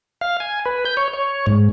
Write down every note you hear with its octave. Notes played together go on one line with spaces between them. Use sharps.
F5
G#5
B4
G6
C#5
C#5
G#2